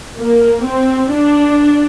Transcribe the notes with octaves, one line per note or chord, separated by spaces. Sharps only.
A#3
C4
D4